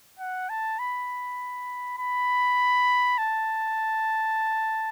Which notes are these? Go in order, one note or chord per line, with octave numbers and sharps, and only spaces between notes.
F#5
A5
B5
B5
A5